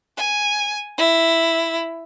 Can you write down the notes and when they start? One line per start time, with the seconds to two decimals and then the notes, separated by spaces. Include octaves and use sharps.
0.17 G#5
0.98 E4